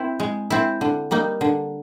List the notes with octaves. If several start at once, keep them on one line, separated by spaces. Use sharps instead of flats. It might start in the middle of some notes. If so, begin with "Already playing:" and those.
Already playing: C4 E4
G#3
C4 E4
D3
G3 A#3 D#4
D3